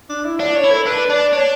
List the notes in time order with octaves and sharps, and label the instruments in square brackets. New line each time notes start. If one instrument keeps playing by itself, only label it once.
[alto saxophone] D4
E4
[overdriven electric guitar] D4 [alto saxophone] D5
[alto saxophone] C#5
[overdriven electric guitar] E4
[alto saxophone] A4
[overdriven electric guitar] D4 [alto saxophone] B4
[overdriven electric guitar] D4 [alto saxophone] D5
[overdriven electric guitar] D4 [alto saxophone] C#5